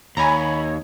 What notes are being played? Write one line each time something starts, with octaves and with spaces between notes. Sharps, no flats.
D#2 C#5 G#5 A#5 B5